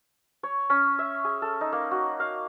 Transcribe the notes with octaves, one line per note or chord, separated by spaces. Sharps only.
C#5
C#4
E5
G#4
A4
D#4
A#3
F#4
F5